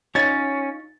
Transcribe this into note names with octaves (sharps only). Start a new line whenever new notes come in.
C#4 D#4 F4 C#5 A6